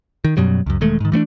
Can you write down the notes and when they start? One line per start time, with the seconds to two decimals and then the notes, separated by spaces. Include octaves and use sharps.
0.24 D#3
0.37 F#2 B2 F#3 G3
0.66 C#2 F#2
0.81 E1 D#3 G#3 A3
1.00 G#2 D#3
1.12 E3 A3 B3 D4